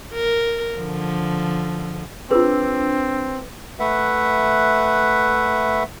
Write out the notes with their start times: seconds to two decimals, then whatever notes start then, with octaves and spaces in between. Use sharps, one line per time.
0.13 A#4
0.76 D3 F3
2.31 C4 D4 F4 G#4 B4 E6
3.80 A3 B4 E5 F#5